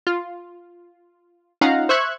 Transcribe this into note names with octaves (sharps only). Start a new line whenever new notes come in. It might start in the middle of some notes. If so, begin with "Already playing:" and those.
F4
C#4 D#4 F4 F5 F#5 A#5
C5 E5 C#6 F#6 G#6